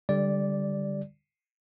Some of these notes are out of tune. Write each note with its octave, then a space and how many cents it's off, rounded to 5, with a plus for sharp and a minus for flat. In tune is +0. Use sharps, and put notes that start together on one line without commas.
D3 +0 G3 +15 D5 -5